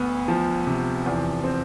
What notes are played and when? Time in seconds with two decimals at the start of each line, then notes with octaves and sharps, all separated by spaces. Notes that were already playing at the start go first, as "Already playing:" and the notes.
Already playing: D2 B3
0.28 F3
0.67 C3
1.06 E2
1.44 C4